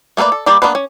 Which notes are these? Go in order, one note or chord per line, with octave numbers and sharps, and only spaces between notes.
A3 A#3 A4 B4 D5
A4
G3 A#3 G4 D5 B5
A#3 B3 C#4 D4 B4
C#4